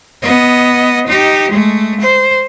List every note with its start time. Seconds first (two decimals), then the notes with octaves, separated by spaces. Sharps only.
0.22 B3 D#5
1.07 D#4 G4
1.51 G#3 A3
2.01 C5